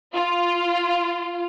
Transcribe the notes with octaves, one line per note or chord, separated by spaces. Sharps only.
F4